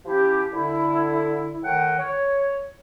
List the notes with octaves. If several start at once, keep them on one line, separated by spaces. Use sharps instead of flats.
F3 C#4 E4 G4
D3 E4
A2 D#3 F#5 G5
C#5